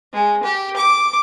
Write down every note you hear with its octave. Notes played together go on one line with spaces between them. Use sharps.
G#3
G4
D6